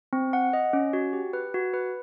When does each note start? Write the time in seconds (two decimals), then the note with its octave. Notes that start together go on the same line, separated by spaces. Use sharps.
0.13 C4
0.33 F#5
0.53 D#5
0.73 C#4
0.93 F#4
1.13 G4
1.33 B4
1.54 F#4
1.73 B4